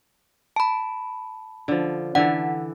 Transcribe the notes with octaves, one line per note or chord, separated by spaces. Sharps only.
A5 B5
D3 F3
D3 E3 A4 F#5